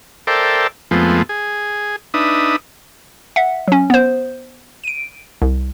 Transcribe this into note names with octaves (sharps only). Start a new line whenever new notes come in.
A4 A#4 C5 D5 E5 G5
F2 F3 G#3 A3 B3 C4
G#4
D4 D#4 B4 E5 D#6
E5 F#5
F#3 C#4
B3 C5
D7 D#7
C2